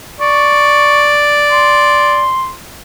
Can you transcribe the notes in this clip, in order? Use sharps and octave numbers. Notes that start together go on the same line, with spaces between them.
D5 C#6
C6